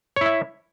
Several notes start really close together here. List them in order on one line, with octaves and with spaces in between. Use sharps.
C#5 E4 E5